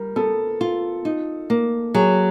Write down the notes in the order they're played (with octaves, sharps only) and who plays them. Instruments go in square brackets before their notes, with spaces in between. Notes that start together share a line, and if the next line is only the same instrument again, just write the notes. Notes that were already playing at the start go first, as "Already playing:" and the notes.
Already playing: [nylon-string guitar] G3 [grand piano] A#4
[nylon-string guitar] B3 [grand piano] A4
[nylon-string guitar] F4
D#4
A#3
[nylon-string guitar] F#3 [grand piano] G#4